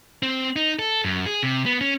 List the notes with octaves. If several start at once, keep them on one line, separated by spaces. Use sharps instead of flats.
C4
D#4
A4
F#2
G#4
C3
B3
C#4